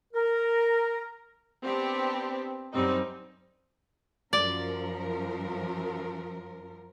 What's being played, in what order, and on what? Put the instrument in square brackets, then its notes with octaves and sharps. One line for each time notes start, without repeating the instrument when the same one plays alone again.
[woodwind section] A#4
[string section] B3 C4 D4 G4
F#2 G3 C4 D#4
[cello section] F#2 F3 A#4 [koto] D5